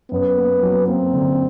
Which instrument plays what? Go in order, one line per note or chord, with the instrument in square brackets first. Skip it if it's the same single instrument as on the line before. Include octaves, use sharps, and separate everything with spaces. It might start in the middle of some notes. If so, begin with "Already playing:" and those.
[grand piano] F#2 [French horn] B3
[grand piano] A#3
F#3
[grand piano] A#3 [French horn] C4
[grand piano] D3